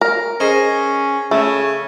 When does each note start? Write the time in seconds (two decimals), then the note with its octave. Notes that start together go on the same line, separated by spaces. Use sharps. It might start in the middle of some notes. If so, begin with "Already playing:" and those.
0.01 A#4
0.40 C#4 G#4 C5 D#5
1.31 C#3 A3